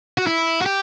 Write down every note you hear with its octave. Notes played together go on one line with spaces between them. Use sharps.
F#4
E4
F#4
G4